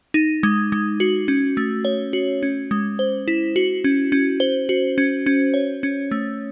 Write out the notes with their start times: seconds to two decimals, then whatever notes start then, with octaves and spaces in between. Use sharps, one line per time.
0.14 D#4
0.43 G#3
0.72 G#3
1.00 F#4
1.28 C#4
1.57 A3
1.85 C#5
2.13 F#4
2.43 C#4
2.71 G#3
2.99 C5
3.28 E4
3.56 F#4
3.84 C#4
4.12 C#4
4.40 C5
4.69 F#4
4.98 C#4
5.26 C#4
5.54 C#5
5.83 C#4
6.11 A3